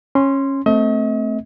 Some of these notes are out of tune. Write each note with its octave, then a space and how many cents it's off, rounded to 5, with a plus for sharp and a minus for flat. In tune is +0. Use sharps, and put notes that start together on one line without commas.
C#4 -20 C6 +0
A3 +0 C4 +0 D#5 +40